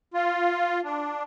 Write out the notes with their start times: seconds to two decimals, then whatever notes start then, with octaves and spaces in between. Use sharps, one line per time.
0.14 F4
0.84 D4